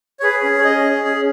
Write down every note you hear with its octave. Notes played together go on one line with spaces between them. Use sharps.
C#5
G#4 B4
C#4
C#5
G#4 D#5
C#4
G#4